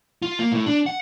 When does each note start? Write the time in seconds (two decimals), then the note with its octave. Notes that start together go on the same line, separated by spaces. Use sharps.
0.22 F4
0.39 A#3
0.52 A2
0.66 D4
0.86 F#5